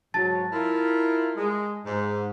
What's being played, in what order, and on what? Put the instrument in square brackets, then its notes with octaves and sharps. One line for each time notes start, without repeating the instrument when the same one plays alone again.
[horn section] G#2 F#3 [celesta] A5 A6
[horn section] E4 F4 A#4
G#3
G#2